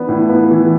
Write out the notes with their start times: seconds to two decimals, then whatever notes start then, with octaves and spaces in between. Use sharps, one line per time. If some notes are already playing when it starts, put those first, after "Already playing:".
Already playing: E3 B3 D4
0.09 A2
0.29 B3
0.51 E3